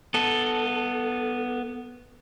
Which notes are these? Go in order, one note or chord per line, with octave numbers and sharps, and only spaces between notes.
B3 A4